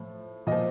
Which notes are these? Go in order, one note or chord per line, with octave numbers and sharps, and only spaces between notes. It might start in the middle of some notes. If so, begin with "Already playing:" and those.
Already playing: A2 F3
A#2 F3 D#5